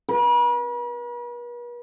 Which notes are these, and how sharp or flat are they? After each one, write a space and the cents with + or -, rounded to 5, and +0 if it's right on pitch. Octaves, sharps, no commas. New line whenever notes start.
B4 -45